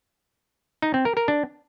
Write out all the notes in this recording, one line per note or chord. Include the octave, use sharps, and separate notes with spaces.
D#4
C4
A#4
A#4
D4